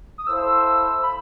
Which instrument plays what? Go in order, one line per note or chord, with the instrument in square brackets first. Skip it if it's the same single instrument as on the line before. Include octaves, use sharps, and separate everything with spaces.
[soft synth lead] D#6
[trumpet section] E4 A4 C5 F5 [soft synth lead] E6
[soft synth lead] B5